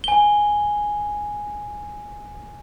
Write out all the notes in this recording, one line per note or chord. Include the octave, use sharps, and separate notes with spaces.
G#5 G7